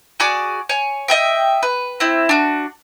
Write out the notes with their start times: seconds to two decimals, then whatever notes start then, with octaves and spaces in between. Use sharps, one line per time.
0.20 F#4 G#4 D5 D6
0.69 C#5 G#5
1.08 D#5 E5 G5
1.63 B4
2.00 C4 E4
2.29 D4 F#4